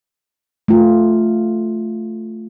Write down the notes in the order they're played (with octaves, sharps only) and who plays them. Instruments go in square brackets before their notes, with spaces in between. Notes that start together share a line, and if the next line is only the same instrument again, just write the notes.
[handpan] A3 F4